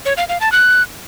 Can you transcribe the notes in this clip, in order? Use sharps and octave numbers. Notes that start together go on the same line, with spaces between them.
C#5
F5
F5
A5
F#6